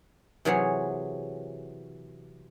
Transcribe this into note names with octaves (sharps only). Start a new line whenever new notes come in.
C3 E3 F#3 G#4 C#5 F#5